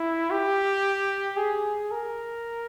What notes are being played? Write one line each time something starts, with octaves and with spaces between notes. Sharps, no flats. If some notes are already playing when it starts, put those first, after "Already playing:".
Already playing: E4
G4
G#4
A#4